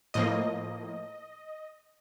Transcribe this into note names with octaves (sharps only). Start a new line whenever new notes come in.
A2 F3 A#3 D#5